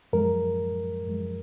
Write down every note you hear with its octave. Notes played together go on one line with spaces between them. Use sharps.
F#2 F3 G#3 A#4
F#2 F3 G#3